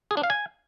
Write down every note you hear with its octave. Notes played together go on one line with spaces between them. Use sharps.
G#4
D4
F5
G#5